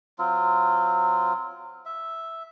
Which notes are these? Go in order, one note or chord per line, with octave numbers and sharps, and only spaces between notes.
F#3 C4 F4
E5